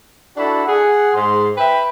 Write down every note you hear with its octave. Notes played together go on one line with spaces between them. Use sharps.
D4 E4 F#4 A4
G#4 F#5
G#2 C6
B4 E5 G5